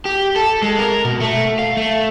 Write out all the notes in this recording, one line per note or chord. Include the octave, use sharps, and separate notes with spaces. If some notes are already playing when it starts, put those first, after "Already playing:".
G4
A4
G#3
A#4
B2
A3
F5
A3